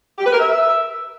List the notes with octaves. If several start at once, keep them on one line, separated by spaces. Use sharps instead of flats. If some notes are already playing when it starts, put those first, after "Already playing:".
G4
B4
A#4
E5